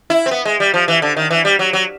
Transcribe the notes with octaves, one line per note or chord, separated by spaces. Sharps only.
E4
C4
B3
G#3
G3
F3
E3
D3
D#3
E3
G3
F#3
F#3